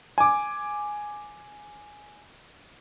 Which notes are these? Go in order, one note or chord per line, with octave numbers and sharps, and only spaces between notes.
G#5 D6